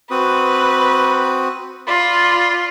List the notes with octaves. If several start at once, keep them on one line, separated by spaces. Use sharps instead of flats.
C4 F#4 B4 D#6
F4 D5 B5